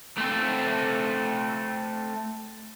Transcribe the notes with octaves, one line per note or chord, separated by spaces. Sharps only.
A3 C4